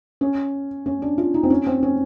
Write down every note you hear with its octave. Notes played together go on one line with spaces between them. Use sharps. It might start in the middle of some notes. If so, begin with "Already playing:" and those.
C#4
C#4
D4
F4
D#4
C4
C#4
C4
C#4